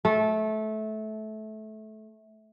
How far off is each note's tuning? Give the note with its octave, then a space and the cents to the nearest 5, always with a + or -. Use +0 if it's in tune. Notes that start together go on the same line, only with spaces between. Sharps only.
A3 -20